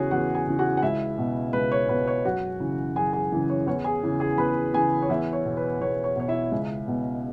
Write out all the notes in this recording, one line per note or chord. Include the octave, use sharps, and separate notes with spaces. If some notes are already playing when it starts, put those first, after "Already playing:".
Already playing: E2 C#3 E3 F#4 G#4 C#5 F#5
E2 F#4 F#5
G#4 G#5
C#3 E3
F#4 F#5
F#5
C#2 E4 E5
B2
C#2 B4
C#5
B2 B4
C#5
F#2 F#4 F#5
C#3 E3
F#2 G#4 G#5
G#4 G#5
C#3 E3
C#5
E2 C#5
G#4 G#5
C#3 E3
G#4 G#5
E2 B4 B5
C#3 E3 G#4 G#5
C#5
E2 E4 E5
C#5
B2
B4
E2 C#5
C#5
B2 C#5
E4 E5
C#2
B2